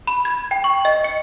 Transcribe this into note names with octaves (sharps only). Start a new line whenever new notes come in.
B5
G#6
G5
C#6
D#5
C#7